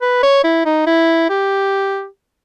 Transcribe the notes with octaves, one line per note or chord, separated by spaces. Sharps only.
B4
C#5
E4
D#4
E4
G4